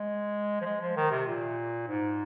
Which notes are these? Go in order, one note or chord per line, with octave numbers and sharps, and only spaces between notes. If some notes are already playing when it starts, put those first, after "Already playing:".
Already playing: G#3
F3
G#3
F3
D#3
C3
A#2
G#2